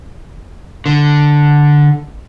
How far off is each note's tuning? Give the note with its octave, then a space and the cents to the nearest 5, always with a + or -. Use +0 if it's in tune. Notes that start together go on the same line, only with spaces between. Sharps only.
D3 +0